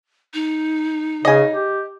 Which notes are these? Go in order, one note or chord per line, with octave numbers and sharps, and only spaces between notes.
D#4
C#3 D#5 G#5
G4